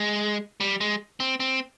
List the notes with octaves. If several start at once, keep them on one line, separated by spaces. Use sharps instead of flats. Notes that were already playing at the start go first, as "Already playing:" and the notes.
Already playing: G#3
G3
G#3
C4
C4